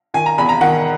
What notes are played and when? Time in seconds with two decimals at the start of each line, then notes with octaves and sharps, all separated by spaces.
0.14 D#3 G#5
0.26 A#5
0.38 E2 B5
0.49 A#5
0.61 D#3 F#5